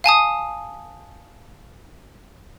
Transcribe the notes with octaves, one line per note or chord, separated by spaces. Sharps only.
F5 G#5 A5 D#6